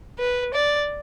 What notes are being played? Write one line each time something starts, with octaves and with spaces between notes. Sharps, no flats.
B4
D5